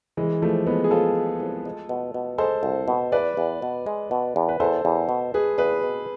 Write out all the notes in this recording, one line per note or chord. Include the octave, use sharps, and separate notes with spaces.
C2 E3 G#3
C2 F3 A3
C2 G#3 B3
G#4
C4 F4 A4
G#3
C2
G#3
B2
B2
G#3 A4 C5
C2
B2
E2 B4 D5
E2
B2
G#3
B2
E2
B4
E2 A4 C5
E2
B2
G#3 G#4 B4
E2 G#4 B4
B2